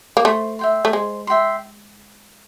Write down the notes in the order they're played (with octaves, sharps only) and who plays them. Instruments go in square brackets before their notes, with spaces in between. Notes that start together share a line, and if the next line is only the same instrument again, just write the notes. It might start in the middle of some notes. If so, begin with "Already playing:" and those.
[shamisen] A#3
[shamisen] A3 [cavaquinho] C5
[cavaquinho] E5 G5 C6
[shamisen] A3
[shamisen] G#3 [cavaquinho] C5
[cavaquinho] E5 G5 C6